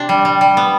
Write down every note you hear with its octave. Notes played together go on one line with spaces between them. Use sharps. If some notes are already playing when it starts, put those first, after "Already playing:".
Already playing: C3 D4
G3
G3
G3
B3